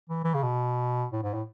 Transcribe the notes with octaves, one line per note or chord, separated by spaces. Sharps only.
E3
E3
C#3
B2
A2
G#2
A2